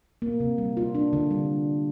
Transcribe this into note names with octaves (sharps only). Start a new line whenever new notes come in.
A#3
C3
G3
F4
D4
D3
G3